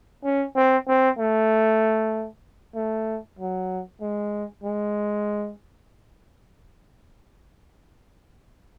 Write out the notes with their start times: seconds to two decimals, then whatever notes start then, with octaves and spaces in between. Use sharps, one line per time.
0.24 C#4
0.55 C4
0.88 C4
1.18 A3
2.75 A3
3.39 F#3
4.01 G#3
4.64 G#3